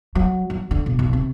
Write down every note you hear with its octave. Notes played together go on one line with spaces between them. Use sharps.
F#3
F#3
D3
B2
B1
C3